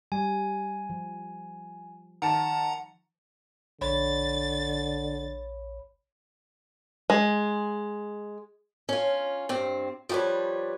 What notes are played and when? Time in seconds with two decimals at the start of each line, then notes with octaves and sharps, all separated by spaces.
0.12 G3 G#5
0.90 F3
2.22 D#3 F#5 A5 A#5
3.81 A#1 D3 C#5 B5 A6
7.10 G#3
8.89 C#4 F4
9.49 G2 C4
10.09 F3 G3 F#4 B4 C#5